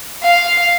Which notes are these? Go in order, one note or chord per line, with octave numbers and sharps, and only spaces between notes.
F5